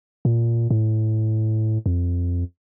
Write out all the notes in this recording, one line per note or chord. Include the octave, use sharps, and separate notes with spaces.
A#2
A2
F2